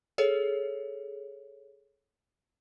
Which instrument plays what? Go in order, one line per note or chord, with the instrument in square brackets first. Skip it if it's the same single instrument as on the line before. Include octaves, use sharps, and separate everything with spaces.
[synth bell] G#4 A4 C#5